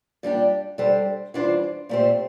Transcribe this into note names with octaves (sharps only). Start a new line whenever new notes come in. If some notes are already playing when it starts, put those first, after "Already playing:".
A#2 G3 D4 G4
G3 D4 A4 C5
E3 G3 D4 F4 C5
A#2 A3 C4 G4 C5